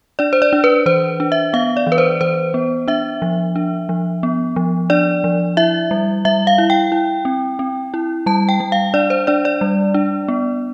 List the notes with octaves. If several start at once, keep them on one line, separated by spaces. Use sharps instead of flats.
D4 D5
C5
D5
D4
B4
E3 C5
D4
E5
B3 F5
D5
E3
B4
C5
E3 C5
B3
D4 E5
F3
D4
F3
B3
F3
D4 D5
F3
E4 E5
G3
G3 E5
F5
E4
G5
E4
C4
C4
E4
G3 A5
G5
G3
F5
D4 D5
C5
D4 D5
D5
G3
D4
B3